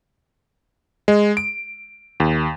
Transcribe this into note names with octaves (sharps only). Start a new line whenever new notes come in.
G#3
D7
D#2